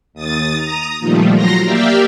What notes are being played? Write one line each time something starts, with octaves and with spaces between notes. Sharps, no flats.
D#2 D#6 A6
A#5 D#6
A#2 D#3 F3 G3 A3
F3 F#3 A#5 C6 A#6
A#3 G4 D5 E5 F5 G5